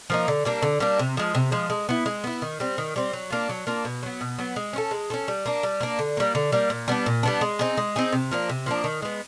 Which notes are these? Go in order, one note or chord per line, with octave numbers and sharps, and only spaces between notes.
F3 A#3 D#4
D3
G3 A#3 D4
D3
G3 A#3 D4
C3
F3 G#3
C3
F3 G#3
G#3
B3 E4
G#3
B3 E4
D#3
G3 C4
D#3
G3 C4
F#3
A#3 D4 F4
F#3
A#3 D4 F4
B2
F#3 B3
B2
F#3 B3
G#3
C#4 F4 A4
G#3
C#4 F4 A4
G3
A#3 D4
G3
A#3 D4
D3
G3 A#3
D3
G3 A#3
A#2
G3 B3 D4
A#2
G3 B3 D4
G#3
C4 D#4 G#4
G#3
C4 D#4 G#4
C3
F3 A#3 D4
C3
F3 A#3 D4
D#3
G#3 B3